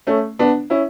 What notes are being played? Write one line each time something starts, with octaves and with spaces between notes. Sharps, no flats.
A3 C#4
B3 D4
C#4 E4